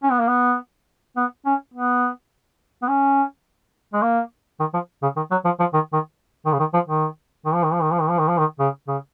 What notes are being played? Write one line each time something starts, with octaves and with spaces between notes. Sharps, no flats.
C#4
B3
A#3
B3
B3
C#4
B3
B3
C#4
G#3
A#3
D#3
F3
C#3
D#3
F#3
F3
F3
D#3
D#3
D#3
C#3
D#3
F3
D#3
D#3
F3
D#3
F3
D#3
F3
D#3
F3
D#3
F3
D#3
C#3
C#3